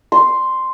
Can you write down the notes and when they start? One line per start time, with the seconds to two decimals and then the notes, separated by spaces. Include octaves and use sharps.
0.12 C6